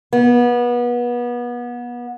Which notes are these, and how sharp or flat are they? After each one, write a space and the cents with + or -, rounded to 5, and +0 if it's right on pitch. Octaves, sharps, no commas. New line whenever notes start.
B3 -30